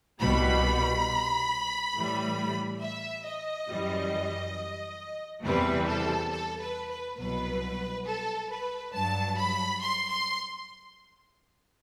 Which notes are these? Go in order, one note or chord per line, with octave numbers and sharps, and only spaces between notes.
C2 B2 G3 B5
A2 E3 G3
E5
D#5
F#2 E3 G3
E2 C3 E3 G3 B4
A4
A4
B4
B4
C2 B2 F#3 B4
A4
B4
G2 F#3 A5
B5
C6
C6